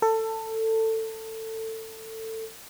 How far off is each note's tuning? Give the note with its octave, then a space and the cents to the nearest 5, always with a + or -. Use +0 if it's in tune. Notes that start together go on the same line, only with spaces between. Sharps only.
A4 +20